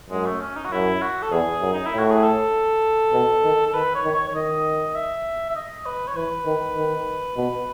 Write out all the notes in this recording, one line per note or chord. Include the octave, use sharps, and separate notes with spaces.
F#2 G#3
A3
C#4
D#4
F#4
F#2 E4
F#4
A4
E2 G#4
F#2
D#4
E4
A2
F#4
G#4
A4
B2
D#3
A4
D#3 B4
C#5
D#3
C#5
C#5
D#3 D#5
E5
E5
D#5
B4
C#5
E3 B4
D#3
D#3
B2